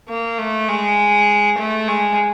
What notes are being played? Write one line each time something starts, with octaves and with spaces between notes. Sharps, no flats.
A#3
A3
G#3
A3
G#3